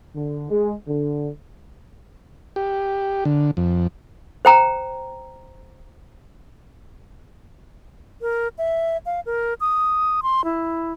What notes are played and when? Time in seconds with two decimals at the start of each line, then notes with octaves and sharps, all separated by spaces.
0.15 D3
0.50 G#3
0.87 D3
2.56 G4
3.25 D3
3.57 F2
4.45 C5 G5 A#5
8.22 A#4
8.58 E5
9.06 F5
9.26 A#4
9.61 D#6
10.23 C6
10.45 E4